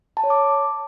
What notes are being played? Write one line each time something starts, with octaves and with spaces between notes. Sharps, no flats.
A5
C#5
D6